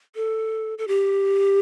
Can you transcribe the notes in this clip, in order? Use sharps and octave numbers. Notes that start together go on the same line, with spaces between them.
A4
A4
G4